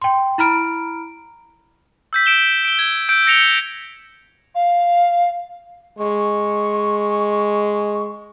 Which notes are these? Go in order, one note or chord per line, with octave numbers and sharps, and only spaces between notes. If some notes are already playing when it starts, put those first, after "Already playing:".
G5 C6
E4 A#5 B5 F6 D7
E6 G6 B6
D7 E7 G7
D7 G7
G#6
E6 G6 D7
E6 A#6 C#7 F7 G7
F5
G#3 C#6